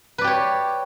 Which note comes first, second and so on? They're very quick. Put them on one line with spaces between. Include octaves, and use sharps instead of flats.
B4 D5 G4 C#5